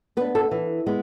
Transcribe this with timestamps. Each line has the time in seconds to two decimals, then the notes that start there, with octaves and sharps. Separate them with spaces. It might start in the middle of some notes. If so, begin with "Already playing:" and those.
0.17 B3 B4
0.21 D4
0.35 A4
0.51 E3
0.87 G#3 B3